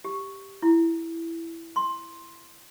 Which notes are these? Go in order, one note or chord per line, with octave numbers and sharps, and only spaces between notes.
G4
E4
C6